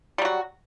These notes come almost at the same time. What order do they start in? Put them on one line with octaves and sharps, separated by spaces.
G3 F#3 F#4